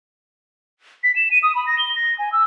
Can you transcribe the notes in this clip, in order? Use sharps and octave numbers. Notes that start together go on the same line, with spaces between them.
B6
E7
D#7
D#6
B5
A#6
G7
A#6
G#5
E6